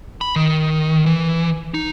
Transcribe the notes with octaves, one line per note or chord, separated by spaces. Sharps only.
B5
D#3
E3
D#4